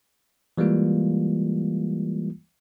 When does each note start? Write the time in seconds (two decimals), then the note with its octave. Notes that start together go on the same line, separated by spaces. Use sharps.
0.58 E3 G3 G#3 A#3 F4